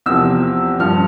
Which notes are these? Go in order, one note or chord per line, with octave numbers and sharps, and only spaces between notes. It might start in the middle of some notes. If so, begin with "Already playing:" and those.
E2 C3 F3 E6
G2 F3 F6